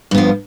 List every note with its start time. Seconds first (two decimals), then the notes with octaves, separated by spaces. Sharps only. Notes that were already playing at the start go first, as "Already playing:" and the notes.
0.11 G2
0.15 B3
0.18 F3